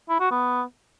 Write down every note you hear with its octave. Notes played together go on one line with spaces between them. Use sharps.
E4
F#4
B3